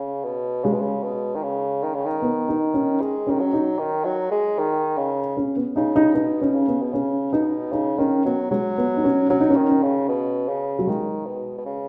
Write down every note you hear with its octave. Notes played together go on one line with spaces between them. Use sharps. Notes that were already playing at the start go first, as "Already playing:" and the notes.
Already playing: C#3
B2
C#3 G#3
B2
C#3
B2
D#3
C#3
D#3
C#3
D#3
B3
D#4
C#4
G#3
D#3 C#4
F#3
D#4
D#3
F#3
G#3
D#3
C#3
C#4
B3
C#3 D#4
D#4
B2 D#4
C#4
C#3
B3
B2
C#3 C#4
B2 D#4
C#3 D#4
D#3 C#4
F#3 B3
F#3 G#3
B3
D#4
C#4
F#3 C#4
D#4
C#4
D#3
C#4
C#3
B2
C#3
F#3
D#3 G#3
B2
B2
C#3